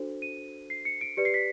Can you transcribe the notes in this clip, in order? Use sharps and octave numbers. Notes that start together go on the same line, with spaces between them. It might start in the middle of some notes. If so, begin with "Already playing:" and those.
Already playing: D4 F#4 A4 C5
D#7
C7
C#7
D7
G4 B4 D5 C#7
C7
B6